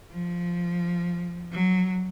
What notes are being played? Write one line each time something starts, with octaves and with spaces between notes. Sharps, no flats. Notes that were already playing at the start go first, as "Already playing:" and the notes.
F3
F#3